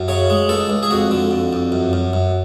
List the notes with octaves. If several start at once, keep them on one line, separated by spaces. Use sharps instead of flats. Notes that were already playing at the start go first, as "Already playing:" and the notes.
Already playing: F#2
C#3 C#5
G#3
C#2 A4
C#2
G#4
F2 F#4
D3
F2
F2
F#2
F#2
F#2